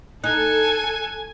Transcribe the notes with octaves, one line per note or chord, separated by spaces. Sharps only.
D#4 A4 G#5 F#6